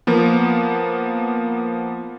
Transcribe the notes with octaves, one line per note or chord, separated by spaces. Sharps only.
F3 A#3 B3